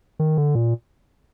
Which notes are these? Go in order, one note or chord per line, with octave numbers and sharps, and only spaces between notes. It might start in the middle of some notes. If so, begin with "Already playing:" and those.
D#3
D3
A#2